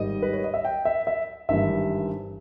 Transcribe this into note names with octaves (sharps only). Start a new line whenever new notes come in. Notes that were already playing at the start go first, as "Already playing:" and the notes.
Already playing: G#1 G#2 D#3 G3 D#5
B4
C#5
D#5
E5
G5
E5
E5
G#1 G2 E3 G3 E5